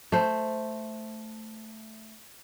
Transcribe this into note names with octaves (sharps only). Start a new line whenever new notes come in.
A3 C5